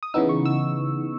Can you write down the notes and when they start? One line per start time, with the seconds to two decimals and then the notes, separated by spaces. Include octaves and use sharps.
0.03 D#6
0.14 C#3 E3 B3 D#4 E6
0.29 C#6
0.46 E6